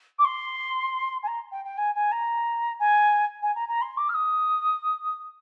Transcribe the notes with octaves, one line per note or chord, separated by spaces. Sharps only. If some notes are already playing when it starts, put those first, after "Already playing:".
D6
C6
G#5
A#5
G5
G5
G#5
G#5
A#5
G#5
G#5
A#5
A#5
C6
D6
F6
D#6